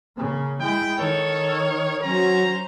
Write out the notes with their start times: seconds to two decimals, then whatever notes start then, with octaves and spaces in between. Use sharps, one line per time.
0.16 C#3 A#3
0.61 G#3 E4 G5
0.98 D#3 A4 C#5
2.03 F#3 C#4 C5 A#5